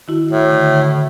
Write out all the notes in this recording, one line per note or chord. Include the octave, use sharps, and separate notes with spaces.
D#3 E4 F#4
A2
D3